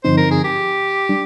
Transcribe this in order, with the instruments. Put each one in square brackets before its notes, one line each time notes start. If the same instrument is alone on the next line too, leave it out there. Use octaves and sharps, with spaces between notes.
[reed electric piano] G2 D3 F3 C4 D#4 [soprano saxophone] C5
[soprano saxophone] A#4
G#4
G4
[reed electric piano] G3 D4